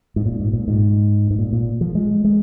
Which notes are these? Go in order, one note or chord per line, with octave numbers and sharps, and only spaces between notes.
G#2
A#2
G#2
A#2
G#2
G#2
A#2
A#2
F3
G#3
G#3